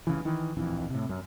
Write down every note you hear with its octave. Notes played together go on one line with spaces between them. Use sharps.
F1 C#3 E3
D#3 E3
D1 A#1 F2 E3
A2 C3
F#2